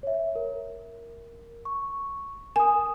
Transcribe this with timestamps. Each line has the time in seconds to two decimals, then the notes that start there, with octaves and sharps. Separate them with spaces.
0.03 C#5 E5
0.35 A#4
1.65 C#6
2.56 A#4 G#5 D#6